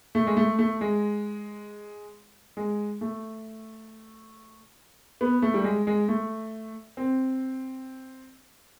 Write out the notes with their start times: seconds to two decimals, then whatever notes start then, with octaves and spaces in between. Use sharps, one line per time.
0.15 A3
0.27 G#3
0.37 A3
0.59 A3
0.81 G#3
2.57 G#3
3.01 A3
5.21 B3
5.42 A3
5.54 G3
5.64 G#3
5.87 G#3
6.08 A3
6.97 C4